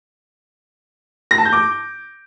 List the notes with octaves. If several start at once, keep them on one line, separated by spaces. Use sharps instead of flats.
A#6
A5
G6
D6